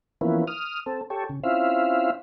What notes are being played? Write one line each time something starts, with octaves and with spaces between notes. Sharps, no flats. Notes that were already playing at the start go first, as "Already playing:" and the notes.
E3 F3 A#3 B3 C#4 E4
D#6 F6
C4 A4
G4 A4 C#5
C#3
C4 C#4 E4 F4 E5 F5